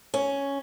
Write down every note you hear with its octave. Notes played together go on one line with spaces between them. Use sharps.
C#4